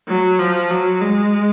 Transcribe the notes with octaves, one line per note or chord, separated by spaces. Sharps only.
F#3
F3
F#3
G#3